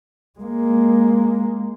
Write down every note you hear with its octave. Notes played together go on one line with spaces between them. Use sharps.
G#3 A#3